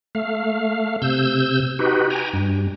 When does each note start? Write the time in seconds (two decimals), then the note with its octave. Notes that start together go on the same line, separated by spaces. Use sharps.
0.15 A3 F5
1.02 C3 E6 G6
1.79 D#4 F#4 G4 B4
2.10 G5 G#5 A#5
2.33 G2